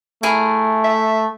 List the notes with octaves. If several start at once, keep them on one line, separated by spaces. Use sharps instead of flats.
A3 E4 G#4 A#4
E5